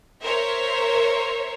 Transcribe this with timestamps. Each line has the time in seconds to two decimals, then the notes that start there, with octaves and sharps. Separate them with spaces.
0.23 A#4 C5 C#5 E5